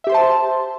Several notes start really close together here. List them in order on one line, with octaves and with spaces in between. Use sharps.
E5 G4 C6 C5 A5